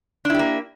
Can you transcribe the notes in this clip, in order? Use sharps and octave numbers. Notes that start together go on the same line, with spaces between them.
A#3 D4 E4 G4